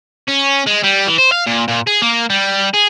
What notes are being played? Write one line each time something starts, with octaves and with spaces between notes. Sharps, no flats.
C#4
G#3
G3
E3
C5
F5
A#2
A#2
G#4
A#3
G3
G#4